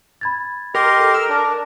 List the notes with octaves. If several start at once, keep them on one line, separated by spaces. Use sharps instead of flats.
B5 G#6 A6
G4 A#4 D#5 C6
A4
E6 F6
D4